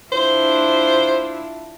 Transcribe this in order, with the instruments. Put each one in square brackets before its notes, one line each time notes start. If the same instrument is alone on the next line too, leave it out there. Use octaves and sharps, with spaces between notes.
[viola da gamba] D4 E4 F4 [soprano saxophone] C5